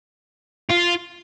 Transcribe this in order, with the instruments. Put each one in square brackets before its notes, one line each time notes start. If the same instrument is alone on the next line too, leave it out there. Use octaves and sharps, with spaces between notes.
[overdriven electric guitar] F4